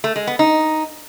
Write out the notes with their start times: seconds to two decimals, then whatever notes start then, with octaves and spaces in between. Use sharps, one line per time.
0.04 A3
0.16 G#3
0.27 B3
0.39 D#4